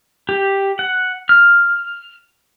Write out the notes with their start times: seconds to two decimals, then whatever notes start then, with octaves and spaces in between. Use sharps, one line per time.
0.29 G4
0.79 F#5
1.29 F6